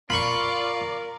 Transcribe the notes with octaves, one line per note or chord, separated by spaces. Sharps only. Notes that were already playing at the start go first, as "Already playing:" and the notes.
F4 A#4 D5 F5 B5 C#6